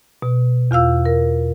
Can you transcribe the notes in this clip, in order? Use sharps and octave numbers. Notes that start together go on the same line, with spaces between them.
B2
E2 F4 F5 E6
A#4